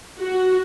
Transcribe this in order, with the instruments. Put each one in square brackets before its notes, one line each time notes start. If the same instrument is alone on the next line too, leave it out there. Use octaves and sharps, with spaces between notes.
[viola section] F#4